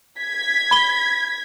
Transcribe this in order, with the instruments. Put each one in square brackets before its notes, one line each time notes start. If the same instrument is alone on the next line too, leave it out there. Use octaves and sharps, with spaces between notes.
[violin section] G#6 B6
[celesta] B5 G7